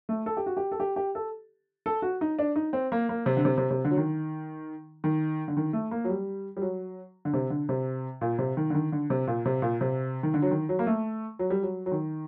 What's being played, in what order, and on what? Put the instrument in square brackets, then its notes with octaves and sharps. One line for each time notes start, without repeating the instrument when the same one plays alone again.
[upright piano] A3
A4
G4
F#4
G4
A4
G4
G4
A4
A4
F#4
D#4
D4
D#4
C4
A#3
A#3
C3
D3
C3
C3
C3
D3
F#3
D#3
D#3
D3
D#3
A3
A#3
F#3
G3
G3
F#3
D3
C3
D3
C3
A#2
C3
D#3
D3
D#3
D3
C3
A#2
C3
A#2
C3
D#3
D3
F#3
D#3
F#3
A#3
A3
F#3
G3
F#3
F#3
D#3